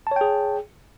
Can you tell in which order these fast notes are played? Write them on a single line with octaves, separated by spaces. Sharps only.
A5 C#5 G5 G#4